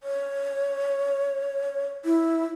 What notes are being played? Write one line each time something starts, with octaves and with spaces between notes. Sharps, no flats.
C#5
E4